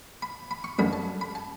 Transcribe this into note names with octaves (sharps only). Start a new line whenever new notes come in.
B5
B5
C#6
A1 G2 F#3 A3 C#4 B5
A5
B5
A5